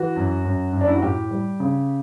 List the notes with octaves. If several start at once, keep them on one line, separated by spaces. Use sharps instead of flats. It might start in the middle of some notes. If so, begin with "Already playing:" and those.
Already playing: E3 F#4
F#2
F#2
F#2
D4
E4
F#4
A2 G4
G3
C#3